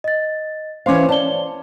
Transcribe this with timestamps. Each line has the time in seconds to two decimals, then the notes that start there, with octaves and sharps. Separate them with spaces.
0.04 D#5 A6
0.86 E3 C#4 C5 F5 C6 D6
1.09 C#5 D5 A5 G7